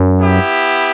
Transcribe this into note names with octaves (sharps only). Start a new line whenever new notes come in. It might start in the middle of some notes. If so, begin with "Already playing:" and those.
Already playing: F#2
B3 E4 G4